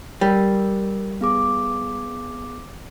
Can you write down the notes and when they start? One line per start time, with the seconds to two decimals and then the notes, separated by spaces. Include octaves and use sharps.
0.21 G3 A#4
1.21 B3 G#4 D6